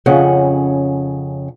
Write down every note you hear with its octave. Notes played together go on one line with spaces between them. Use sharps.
F2 C#3 C#4 F#5